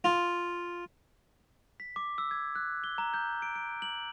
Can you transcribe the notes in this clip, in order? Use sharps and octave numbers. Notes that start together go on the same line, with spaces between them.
F4
B6
D6
E6
G#6
F#6
G7
A#5
G6
D7
D7
F#7